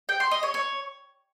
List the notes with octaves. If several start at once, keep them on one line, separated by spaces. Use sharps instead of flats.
G5
C6
D#5
C#5
C#5